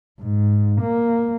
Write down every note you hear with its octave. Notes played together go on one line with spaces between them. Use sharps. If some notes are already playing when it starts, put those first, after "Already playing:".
G#2
A#3